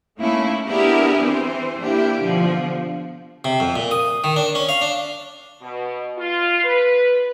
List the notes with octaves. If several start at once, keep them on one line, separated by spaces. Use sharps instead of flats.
A3 A#3 C#4 D#4 E4
B3 D4 E4 G4 G#4 A#4
E3 C4 C5
A#3 D4 E4 G4
B2 D3 F3
C3
F2
A#2
D#6
D#3
D4
C#4
F5
D4
B2
F4
B4